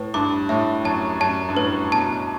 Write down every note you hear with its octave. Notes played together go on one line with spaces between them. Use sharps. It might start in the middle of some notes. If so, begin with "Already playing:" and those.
Already playing: A2 B4
G2 D6
A2 E5
F#2 A5
F#2 A5
G2
A2 B4
B2 A5